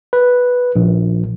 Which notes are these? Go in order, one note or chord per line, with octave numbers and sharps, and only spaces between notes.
B4
A#1